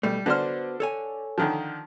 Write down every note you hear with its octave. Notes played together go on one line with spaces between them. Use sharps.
B2 G3 A3
D3 B3 D4 F#4 C5 F6
A4 C#5 G#5
D3 D#3 F3